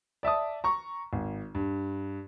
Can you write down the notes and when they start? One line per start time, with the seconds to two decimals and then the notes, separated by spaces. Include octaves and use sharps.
0.23 D5 E5 A5 D#6
0.64 A#5 C#6
1.13 G#1
1.55 G2